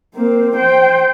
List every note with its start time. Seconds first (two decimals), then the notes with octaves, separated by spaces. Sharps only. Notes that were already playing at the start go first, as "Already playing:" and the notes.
0.15 A#3 C4
0.56 C5 G5